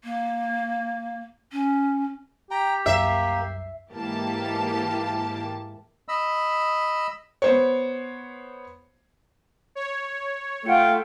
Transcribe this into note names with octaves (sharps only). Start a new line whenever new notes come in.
A#3
C#4
G4 G5 A#5
C2 F#2 A#3 E5 C7
G#2 E3 A#3 G4 A5
D#5 B5 E6
B3 C5 C#5
C#5
A3 F4 F#5 G5 C#7